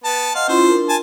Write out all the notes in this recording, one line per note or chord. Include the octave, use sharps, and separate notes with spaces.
B3 A5
D#5 F5 F#5 C6
C#4 E4 F4 C5
D4 A#4
G#5 A5